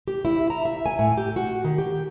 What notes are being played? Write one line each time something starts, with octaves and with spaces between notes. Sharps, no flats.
G4
E4
A#5
E5
G#5
A2
G4
F#4
D#3
G4